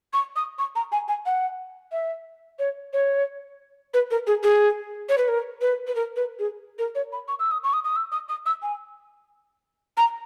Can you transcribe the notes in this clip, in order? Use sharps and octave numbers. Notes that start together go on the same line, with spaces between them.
C#6
D#6
C#6
A#5
G#5
G#5
F#5
E5
C#5
C#5
B4
A#4
G#4
G#4
C#5
B4
A#4
B4
B4
A#4
B4
G#4
A#4
C#5
B5
C#6
E6
D#6
C#6
D#6
D#6
E6
D#6
D#6
E6
G#5
A#5